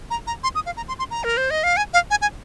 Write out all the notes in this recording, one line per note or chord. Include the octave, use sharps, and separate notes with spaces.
A#5
A#5
C6
D#6
F5
A#5
C6
C6
A#5
A#4
C5
D#5
F5
G#5
F5
G#5
G#5